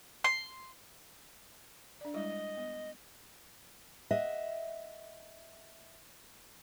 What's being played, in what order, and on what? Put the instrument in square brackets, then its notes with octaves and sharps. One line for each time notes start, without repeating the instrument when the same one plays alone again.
[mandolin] C6
[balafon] D4 D5
[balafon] G3 G#3 E4 [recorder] D#5
[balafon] B3
[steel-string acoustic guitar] D#5 E5 F#5